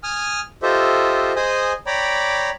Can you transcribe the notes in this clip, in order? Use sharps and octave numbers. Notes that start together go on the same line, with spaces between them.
G#5 D#6 F6
F4 G4 A4 C5 D#5 E5
G#4 C5 D#5 G#5 D#6
C#5 D5 G5 A#5 B5 D6